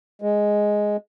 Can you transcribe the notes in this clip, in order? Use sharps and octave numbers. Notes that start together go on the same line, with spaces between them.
G#3